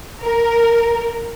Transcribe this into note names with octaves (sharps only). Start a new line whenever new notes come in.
A#4